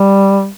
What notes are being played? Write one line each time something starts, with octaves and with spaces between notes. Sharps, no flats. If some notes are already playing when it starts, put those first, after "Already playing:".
Already playing: G3